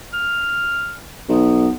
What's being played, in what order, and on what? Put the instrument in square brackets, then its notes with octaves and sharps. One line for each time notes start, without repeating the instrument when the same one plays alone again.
[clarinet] F6
[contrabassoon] B1 [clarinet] B3